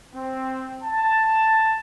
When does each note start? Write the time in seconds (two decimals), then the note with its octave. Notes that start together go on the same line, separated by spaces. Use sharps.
0.14 C4
0.84 A5